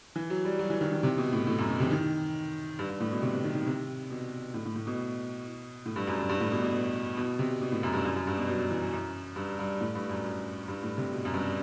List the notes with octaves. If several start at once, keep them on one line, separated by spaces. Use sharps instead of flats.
E3
F#3
G3
F#3
E3
D#3
D#3
C3
B2
A2
A2
F#2
B2
C3
E3
D#3
G2
G2
A2
B2
C3
C3
D#3
D#3
C3
B2
A2
A2
A2
B2
A2
G2
F#2
G2
G2
A2
B2
B2
B2
C3
B2
A2
F#2
G2
F#2
F#2
G2
B2
F#3
E3
F#2
G2
G2
A2
G2
F#2
F#2
G2
A2
C3
B2
F#2
G2